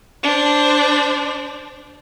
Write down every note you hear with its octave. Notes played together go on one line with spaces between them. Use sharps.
D4 C5